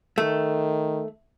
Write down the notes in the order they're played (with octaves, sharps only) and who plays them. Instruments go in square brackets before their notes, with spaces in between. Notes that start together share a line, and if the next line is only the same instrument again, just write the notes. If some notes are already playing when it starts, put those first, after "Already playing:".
[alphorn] D#3 [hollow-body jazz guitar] A3